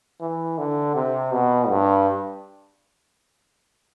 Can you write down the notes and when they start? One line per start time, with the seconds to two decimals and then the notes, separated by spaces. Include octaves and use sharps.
0.21 E3
0.58 D3
0.95 C3
1.32 B2
1.69 G2